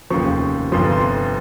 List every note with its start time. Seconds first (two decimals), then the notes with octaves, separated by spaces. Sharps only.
0.10 F1 D#2 C#3 F3 C#6
0.72 G1 F2 C3 F3 C6
0.92 C6